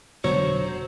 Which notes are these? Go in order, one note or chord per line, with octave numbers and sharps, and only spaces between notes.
F1 B2 D3 F#3 C5 C#5